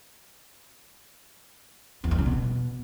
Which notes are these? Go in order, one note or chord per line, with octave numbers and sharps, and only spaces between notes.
E2
G2
C#3
B2